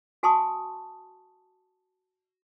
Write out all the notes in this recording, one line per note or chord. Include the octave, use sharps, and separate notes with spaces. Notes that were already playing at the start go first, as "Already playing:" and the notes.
F#4 G#5 A5 C6 C#6 D#6